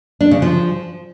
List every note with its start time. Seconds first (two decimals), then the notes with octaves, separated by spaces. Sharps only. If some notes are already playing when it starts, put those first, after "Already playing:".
0.21 D4
0.31 C#3
0.42 F3